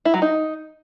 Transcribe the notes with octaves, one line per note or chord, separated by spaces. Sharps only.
E4
F#3
D#4